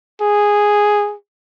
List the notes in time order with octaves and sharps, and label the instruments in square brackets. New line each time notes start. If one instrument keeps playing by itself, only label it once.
[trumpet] G#4